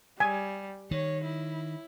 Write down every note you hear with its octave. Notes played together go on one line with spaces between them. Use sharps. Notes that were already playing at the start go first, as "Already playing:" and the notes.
G3 G#5
D#3 C#5
E4